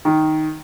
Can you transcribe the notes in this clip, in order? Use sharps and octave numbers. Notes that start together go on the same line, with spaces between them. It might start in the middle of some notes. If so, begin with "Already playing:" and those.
D#3